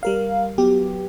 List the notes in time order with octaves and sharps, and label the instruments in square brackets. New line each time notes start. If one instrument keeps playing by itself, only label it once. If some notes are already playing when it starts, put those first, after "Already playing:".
[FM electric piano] G3 A#4 F5
F#3 B3 G4